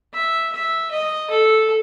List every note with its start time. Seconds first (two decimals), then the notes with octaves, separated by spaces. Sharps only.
0.14 E5
0.53 E5
0.91 D#5
1.30 A4